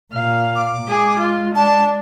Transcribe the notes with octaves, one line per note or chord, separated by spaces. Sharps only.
A#2 F5
D6
G#3 G#4
F4
D4 A5